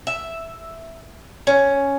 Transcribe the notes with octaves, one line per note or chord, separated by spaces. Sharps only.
E5
C#4